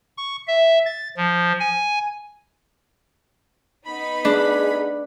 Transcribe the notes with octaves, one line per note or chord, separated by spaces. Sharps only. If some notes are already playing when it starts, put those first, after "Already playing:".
C#6
E5
A6
F3
G#5
B3 D#4 B5
D4 G#4